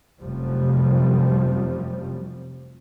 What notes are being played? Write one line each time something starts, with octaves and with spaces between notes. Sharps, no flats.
F1 F#2 C3 F3 G3